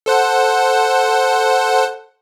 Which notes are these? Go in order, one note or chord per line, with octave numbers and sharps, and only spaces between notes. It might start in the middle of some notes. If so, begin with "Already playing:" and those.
A4 C5 F#5